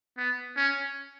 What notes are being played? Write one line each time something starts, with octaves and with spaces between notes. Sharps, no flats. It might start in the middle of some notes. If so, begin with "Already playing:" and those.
B3
C#4